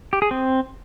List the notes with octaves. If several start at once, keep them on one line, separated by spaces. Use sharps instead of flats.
G4
G#4
C4